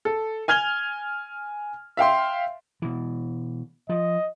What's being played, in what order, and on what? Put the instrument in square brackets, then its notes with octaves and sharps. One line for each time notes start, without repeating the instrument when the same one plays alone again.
[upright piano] A4
G#5 F6 G#6 F7 G7
E5 F5 G5 C6
[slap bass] B2 E3
[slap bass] F3 [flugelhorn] D#5